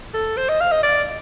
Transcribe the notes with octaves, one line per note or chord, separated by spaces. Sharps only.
A4
C5
D#5
F5
D#5
D5